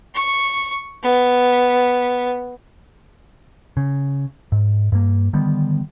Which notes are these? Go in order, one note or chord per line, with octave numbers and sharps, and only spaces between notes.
C#6
B3
C#3
G#2
G2 A#3
D3 D#3 G3 B3